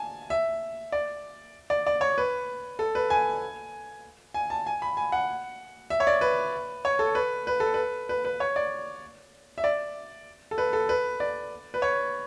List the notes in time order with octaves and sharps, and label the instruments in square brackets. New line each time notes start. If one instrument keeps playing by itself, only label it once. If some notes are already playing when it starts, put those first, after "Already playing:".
Already playing: [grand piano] G#5 A5
E5
D5
D5
D5
C#5
B4
A4
B4
G#5
G#5
A5
G#5
B5
G#5
F#5
E5
C#5
D5
B4
C#5
A4
B4
B4
A4
B4
B4
B4
C#5
D5
E5
D5
A4
B4
A4
B4
D5
B4
C#5